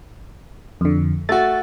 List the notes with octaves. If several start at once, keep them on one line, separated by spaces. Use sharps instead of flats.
F2 D3
A3 F#4 A6